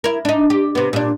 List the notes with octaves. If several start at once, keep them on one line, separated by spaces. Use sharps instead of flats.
E4 A#4
D4 D#4
G4
C3 B3
A#2 D4